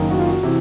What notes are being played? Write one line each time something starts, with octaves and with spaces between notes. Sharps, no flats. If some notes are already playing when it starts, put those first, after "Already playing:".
Already playing: F#1 F#2 D#3
F#4
F4
F#4
C3 E3